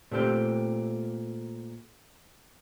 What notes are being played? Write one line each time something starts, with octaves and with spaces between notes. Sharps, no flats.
A#2 A3 C4 G4